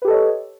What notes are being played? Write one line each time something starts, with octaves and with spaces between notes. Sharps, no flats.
G4 A4 B4 C#5 D#5